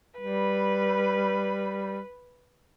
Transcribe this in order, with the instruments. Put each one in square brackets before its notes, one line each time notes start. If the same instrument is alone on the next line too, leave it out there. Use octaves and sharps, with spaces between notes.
[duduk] G3 [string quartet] B4